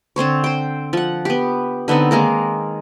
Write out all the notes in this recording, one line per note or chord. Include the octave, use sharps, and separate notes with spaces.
D3 C4 C5 C#5
C5 G5
F3 F#5
B3 G4
D3 B3 C4 D#4
D#3 G#3 A#3 A#4